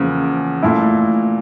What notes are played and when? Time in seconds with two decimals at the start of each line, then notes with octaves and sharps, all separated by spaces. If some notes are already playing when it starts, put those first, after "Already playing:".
Already playing: E2 C#3 F3 A#3
0.63 A#2 A3 E4